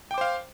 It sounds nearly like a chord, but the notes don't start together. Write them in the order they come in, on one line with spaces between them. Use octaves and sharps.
G5 D6 C5 F5